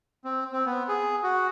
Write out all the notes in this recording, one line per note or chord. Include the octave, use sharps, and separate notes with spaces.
C4
C4
B3
G#4
F#4